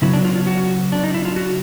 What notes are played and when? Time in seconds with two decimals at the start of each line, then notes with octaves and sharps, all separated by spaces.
0.02 C#3 F#3 B3 E4
0.13 D4
0.25 F4
0.36 F4
0.47 F#4
0.92 D4
1.03 D#4
1.14 E4
1.25 F4
1.36 F#4